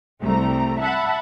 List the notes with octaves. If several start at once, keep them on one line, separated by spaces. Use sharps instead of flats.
C2 A3 A#5
E5 F#5 A5 B5